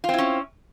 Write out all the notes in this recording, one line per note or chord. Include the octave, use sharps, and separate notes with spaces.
C4 C#4 E4 F4